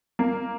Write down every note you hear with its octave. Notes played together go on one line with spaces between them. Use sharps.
A#3